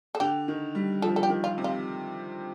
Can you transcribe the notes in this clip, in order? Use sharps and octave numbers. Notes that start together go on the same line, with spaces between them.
A4
D3 G4
D#3
G3
F3 A4
A4
G4
D#3
F4
C3
F4